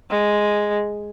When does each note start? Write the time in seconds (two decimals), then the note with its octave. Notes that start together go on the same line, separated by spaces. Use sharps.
0.10 G#3